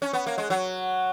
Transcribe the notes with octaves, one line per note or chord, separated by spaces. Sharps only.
C#4
B3
A#3
G#3
F#3